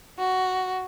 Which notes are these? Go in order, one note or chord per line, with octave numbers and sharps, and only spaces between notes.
F#4